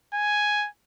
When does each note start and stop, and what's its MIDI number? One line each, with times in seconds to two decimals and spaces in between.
0.14 0.67 80